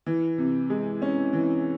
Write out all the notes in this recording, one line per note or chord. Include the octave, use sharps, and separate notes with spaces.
E3
C3
G#3
C#4
E3